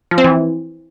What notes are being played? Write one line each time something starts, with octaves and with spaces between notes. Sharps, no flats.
F3
C4
E3